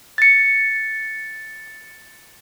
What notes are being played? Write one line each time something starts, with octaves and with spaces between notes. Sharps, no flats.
A6 C#7